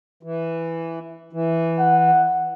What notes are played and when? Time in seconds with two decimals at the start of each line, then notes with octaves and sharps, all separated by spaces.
0.23 E3
1.33 E3
1.79 F#5